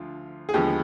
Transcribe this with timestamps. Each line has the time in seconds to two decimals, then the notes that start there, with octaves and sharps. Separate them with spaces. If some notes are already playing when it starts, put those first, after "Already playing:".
Already playing: D2 D3 F3 F4
0.49 G#4
0.54 D#2 D3 F3 G#3 B3 G4